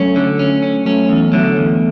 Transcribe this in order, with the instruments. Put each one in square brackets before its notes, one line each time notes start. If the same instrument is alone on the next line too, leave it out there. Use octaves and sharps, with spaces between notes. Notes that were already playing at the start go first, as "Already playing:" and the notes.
Already playing: [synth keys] F#3 A3 [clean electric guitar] C#4
[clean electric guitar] D3
C#4
C#4
[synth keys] F#3 A3 [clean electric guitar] C#4
[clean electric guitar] E2
[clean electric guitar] D3 [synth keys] F#3 A3
[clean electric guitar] E2